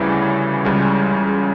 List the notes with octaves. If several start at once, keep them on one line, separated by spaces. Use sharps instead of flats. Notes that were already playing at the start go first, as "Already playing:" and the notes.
Already playing: D2 C#3 E3 G3 E4
C#2 C#3 G3